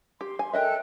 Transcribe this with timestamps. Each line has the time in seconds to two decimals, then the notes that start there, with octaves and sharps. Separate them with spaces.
0.21 G4 C6
0.39 G#5
0.53 A4 A#4 D#5 E5 G5 F#6